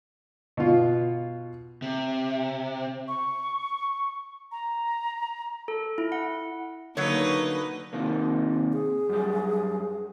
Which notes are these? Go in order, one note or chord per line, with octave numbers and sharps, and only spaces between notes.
B2 F4
C3
C#6
A#5
A4
E4
F#5
D3 F#3 A#3 D#4 B4 C#5
C3 D#3 A#3
G#4
F#2 G3